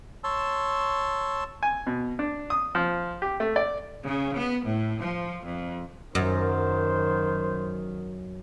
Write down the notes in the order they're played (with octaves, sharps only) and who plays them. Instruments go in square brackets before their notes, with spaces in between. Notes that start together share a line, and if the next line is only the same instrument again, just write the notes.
[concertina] C#5 A5 C6 E6
[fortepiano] G#5
B2
D4
D#6
F3
G4
A3
D5
[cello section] C#3
B3
A2
F3
F2
[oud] F#2 [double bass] D#3 [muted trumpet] C5